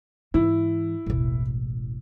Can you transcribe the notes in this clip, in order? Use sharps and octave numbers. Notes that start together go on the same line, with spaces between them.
G#2 E3 E4
E1 A1